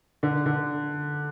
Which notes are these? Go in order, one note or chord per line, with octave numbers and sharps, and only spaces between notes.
D3
D3